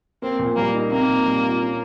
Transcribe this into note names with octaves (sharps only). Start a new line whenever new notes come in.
A#3 C4
A#2
G3 A#3
D#4
A#3 C4
A#2
G3
F4
C#4